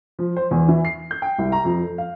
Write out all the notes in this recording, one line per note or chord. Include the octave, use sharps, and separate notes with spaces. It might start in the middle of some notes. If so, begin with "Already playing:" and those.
F3
C5
E2
E3
C7
G6
G5
C2
A#5
F2
A4
F5